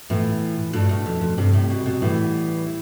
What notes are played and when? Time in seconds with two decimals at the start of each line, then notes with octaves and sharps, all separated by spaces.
0.10 A2 E3 B3 F4
0.73 G2 B2 A3 D4 F4 A4
0.89 A2
1.06 F2
1.21 F2
1.37 G2 C3 G3 C4 G4
1.53 A2
1.70 B2
1.86 B2
2.02 A2 E3 G3 B3
2.67 E4